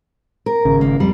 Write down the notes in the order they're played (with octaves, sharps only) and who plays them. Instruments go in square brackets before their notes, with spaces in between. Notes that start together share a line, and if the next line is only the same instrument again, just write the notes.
[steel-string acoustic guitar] A#4
[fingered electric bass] G#1 C#3
[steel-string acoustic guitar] A#3
[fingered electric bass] F2 [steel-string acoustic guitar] G3